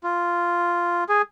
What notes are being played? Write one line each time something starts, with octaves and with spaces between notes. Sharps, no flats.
F4
G#4